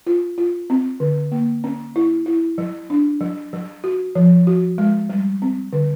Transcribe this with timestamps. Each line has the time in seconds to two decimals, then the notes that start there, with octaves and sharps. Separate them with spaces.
0.07 F4
0.38 F4
0.70 C4
1.00 D3
1.32 A#3
1.64 C#4
1.96 E4
2.26 E4
2.58 F#3
2.90 D4
3.21 F#3
3.53 F#3
3.84 F#4
4.15 F3
4.47 F#4
4.78 G#3
5.10 G3
5.42 C4
5.73 D3